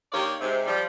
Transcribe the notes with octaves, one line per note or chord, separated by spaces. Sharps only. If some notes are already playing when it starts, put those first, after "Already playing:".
D#2 D#3 A#3 G4 C#5 D5
G#2 C3
F3 G3